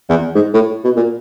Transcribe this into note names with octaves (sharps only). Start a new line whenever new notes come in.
E2
G#2
A2
B2
A#2